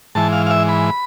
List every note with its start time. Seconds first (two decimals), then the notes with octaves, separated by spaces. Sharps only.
0.15 G#2 E3 A5
0.33 F5
0.46 F5
0.50 E5
0.69 B5